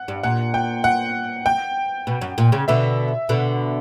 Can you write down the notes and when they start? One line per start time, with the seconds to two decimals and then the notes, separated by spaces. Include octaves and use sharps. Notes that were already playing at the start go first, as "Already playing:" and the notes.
Already playing: F#5
0.08 G2
0.23 A#2 F#5
0.54 G5
0.84 F#5
1.46 G5
2.07 B2
2.21 F#2
2.38 A#2
2.52 C#3
2.68 B2 D3 E5
3.29 B2 D3